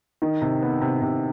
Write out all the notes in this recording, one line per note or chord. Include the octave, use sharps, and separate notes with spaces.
D#3
C3
B3
C3
C3